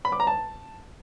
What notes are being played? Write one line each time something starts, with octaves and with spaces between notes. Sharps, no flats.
B5
D6
A#5
A5